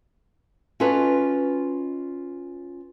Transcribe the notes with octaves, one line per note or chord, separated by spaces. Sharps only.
C#4 F4 F#4 A4 B4 D#5